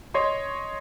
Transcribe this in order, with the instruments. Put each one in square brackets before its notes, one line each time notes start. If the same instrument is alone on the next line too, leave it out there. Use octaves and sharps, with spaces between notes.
[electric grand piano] C#5 D#5 C6